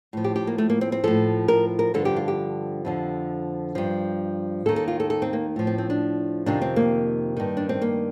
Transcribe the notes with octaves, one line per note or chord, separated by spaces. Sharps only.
A2 F3
G4
G4
A#3
A3
A#3
C4
C4
A2 F3 A4
A#4
A#4
G2 D3 F3 A4
G4
F4
G4
F2 D3 F3
G2 F3
D#2 D#3 A4
A4
F4
A4
A4
C4
A#3
A2 F3
C4
C4
D4
F2 C3 D#3 D4
C4
A#3
G2 D#3
D4
C4
A#3